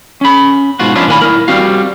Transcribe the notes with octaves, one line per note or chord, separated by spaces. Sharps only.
C#4 B5
G#2 B2 F4 F#4
F3 C#4 D4 E4 F4
A#2 D#3 A#3 B4 G#5 B5
E4 A#4
G3 C4 F#4 F5